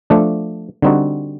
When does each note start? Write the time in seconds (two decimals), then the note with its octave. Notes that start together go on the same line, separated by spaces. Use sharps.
0.10 F3 A3 D4
0.82 D3 G3 C4 D#4 F#4